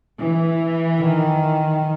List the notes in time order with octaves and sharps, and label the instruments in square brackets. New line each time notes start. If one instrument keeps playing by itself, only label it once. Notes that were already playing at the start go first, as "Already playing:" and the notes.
[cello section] E3
[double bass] D#3